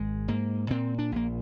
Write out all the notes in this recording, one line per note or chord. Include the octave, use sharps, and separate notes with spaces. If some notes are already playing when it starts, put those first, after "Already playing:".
Already playing: G#1 G#3
G#2 A#3
A#2 C4
D4
A#1 A#3